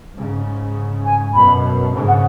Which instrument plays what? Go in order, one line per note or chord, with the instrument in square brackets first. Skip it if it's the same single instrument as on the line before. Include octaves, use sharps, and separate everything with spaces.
[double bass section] G#2 C#3
[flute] G#5
[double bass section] F#2 B2 [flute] B5
[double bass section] G#2 C#3
[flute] F#5